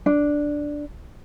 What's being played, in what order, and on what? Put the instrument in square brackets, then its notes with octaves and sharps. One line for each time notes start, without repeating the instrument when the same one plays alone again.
[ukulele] D4